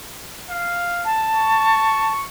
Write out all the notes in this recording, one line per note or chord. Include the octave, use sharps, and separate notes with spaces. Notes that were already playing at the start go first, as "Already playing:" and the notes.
F5
A5
C#6